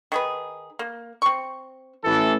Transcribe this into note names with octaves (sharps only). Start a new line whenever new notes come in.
D#3 G#4 B4
A#3
C4 C#6
A1 E3 A4